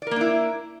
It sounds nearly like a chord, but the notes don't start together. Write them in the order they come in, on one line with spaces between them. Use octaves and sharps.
D5 A#4 A#3 D4 E4